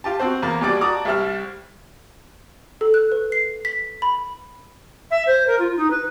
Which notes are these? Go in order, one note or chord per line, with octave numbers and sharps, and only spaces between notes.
F4 G4 A5
C4 F#4 C5
E2 A#3
D#2 G3 F#4 D5 D6
F#4 D5 A5 A#5 D6 D#6
C2 G3 E5 F6
A4
F#6
B4
C7
B6
B5
E5
C5
A#4
F4
D#4
B4